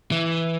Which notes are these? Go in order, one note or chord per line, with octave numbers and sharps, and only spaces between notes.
E3